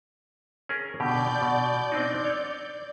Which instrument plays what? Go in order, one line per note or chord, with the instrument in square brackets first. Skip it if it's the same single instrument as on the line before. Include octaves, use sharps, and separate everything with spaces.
[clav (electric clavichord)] C#4 G#4 A#4
[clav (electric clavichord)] B2 D3 G4 [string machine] D5 G6
[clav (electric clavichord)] B2
C4 D4 D#4
C#5